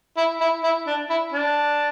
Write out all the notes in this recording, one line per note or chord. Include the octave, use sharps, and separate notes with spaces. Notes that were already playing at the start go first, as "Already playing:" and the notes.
E4
E4
E4
D4
E4
D4